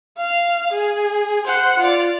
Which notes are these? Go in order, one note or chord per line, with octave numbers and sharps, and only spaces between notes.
F5
G#4
C5 F#5
F4 D5